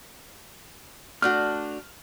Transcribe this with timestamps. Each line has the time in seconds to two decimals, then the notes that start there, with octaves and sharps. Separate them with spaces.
1.22 A3 D4 F#4 F6